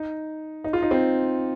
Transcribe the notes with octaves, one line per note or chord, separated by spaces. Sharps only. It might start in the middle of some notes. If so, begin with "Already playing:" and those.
Already playing: D#4
D#4
F4
D#4
C4